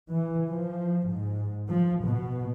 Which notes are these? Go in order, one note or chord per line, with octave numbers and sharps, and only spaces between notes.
E3
F3
G#2
F3
B2